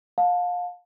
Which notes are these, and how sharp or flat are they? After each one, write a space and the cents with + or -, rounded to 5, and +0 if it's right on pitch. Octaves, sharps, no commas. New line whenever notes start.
F5 +30 A5 +0